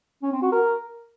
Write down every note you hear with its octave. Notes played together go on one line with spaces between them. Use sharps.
C#4
C4
F#4
A#4